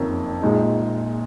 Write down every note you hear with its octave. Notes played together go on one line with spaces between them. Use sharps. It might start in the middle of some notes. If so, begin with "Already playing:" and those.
Already playing: F#1 F2 D#3 A#3 C#4
A#1 A#2 G#3 D#4